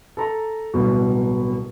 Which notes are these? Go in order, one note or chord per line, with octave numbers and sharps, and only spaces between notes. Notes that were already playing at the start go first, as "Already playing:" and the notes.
A4 A#5
D1 C2 B2